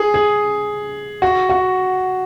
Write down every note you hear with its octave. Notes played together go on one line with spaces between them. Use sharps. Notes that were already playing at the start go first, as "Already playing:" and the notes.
Already playing: G#4
G#4
F#4
F#4